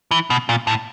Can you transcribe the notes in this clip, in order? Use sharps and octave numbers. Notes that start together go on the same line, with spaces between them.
E3
B2
A#2
A2